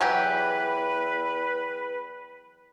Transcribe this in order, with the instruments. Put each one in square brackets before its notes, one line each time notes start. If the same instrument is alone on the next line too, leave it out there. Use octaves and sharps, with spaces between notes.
[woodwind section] E2 B4 [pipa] E3 F#3 G4